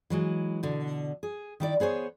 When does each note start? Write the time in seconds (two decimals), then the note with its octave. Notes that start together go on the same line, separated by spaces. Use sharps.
0.10 E3 F#3 G#3
0.63 B2 D3
1.23 G#4
1.60 D#3 E4 D5
1.80 B3 G#4 C5 C#5